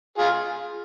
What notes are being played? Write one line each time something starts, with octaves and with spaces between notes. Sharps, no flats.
F4 G#4